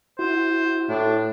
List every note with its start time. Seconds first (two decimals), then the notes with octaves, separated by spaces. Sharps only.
0.19 E4 F#4 C5
0.89 A2 D4